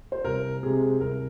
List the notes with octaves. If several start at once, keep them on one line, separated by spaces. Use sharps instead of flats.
C5
C2 A#4
C3 G#3 C4 G#4
C2 A#4